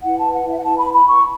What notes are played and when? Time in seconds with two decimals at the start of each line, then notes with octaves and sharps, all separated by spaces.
0.04 E4 B4 F#5
0.19 A5
0.34 F#5
0.49 E5
0.59 F#5
0.64 A5
0.78 B5
0.93 B5
1.07 C#6